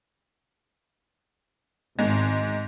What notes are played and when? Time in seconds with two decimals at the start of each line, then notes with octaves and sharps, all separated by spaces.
1.99 G#1 G#2 G#3